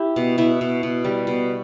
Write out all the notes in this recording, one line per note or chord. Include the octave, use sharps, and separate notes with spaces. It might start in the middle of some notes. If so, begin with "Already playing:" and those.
Already playing: E4 G4
B2
B2 E4
B2
B2
G3
B2